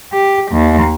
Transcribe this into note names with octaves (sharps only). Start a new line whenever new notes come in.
G4
D#2